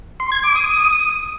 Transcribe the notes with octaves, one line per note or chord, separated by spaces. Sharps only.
C6
G#6
D6
D#6